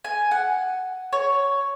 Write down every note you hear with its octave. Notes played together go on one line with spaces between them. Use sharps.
G#5
F#5
C#5